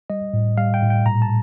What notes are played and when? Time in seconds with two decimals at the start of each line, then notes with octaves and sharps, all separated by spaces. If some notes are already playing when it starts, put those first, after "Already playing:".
0.10 G3 D#5
0.34 A2
0.58 G3 F5
0.74 G5
0.82 A2
0.90 G5
1.06 A#2 A#5
1.22 A5